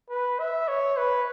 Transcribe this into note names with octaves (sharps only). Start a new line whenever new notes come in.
B4
E5
C#5
B4